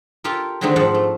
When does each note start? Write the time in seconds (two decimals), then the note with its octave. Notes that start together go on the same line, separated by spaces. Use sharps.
0.24 F4 G4 A4 A#4
0.61 D3 D#3 G#3 A3 C4 D#4
0.76 G#2 F3 C5 D5 F#5
0.94 A3